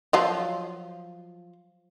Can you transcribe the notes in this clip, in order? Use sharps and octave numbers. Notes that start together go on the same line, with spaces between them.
F3 F#3 F4